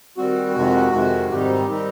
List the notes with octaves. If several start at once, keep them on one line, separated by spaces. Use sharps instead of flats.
D#3 G3 C4 F#4
F2 C3 D#3 G#3
F2 C3 D#3 G#3
G#2 D#3 G3 C4 D#4 G4
D#3 G3 C4 D#4